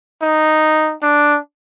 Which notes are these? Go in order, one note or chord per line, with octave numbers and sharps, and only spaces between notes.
D#4
D4